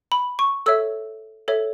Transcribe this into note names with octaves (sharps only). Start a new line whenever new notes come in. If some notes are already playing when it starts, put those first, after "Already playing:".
B5
C#6
A4 C#5 E5 E6
A4 C#5 E5